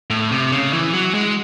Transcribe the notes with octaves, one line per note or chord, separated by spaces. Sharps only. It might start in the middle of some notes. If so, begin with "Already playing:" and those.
A2
C3
C#3
E3
F#3
G#3